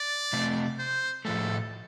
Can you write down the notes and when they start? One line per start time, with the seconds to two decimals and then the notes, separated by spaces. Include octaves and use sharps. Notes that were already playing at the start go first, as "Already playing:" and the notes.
Already playing: D5
0.33 C3 A3 C4
0.79 C5
1.25 A2 F3 A3 A4